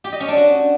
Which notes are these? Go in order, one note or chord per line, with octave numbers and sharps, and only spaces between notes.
G4
D#5
C#4
D4
F#4